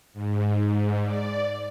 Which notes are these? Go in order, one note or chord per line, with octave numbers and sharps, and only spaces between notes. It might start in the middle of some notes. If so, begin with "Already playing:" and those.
G#2
D5